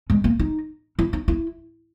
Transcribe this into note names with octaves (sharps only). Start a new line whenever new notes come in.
G#3
A#3
D#4
E4
D#4
E4